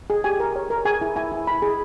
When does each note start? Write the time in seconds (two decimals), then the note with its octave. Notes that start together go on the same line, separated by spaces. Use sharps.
0.10 G#4
0.24 G4 G#5
0.40 A#4
0.56 C#5
0.70 A#4
0.85 G#4 G#5
1.01 E4
1.16 E4 G#5
1.32 E4
1.47 E4 B5
1.62 G#4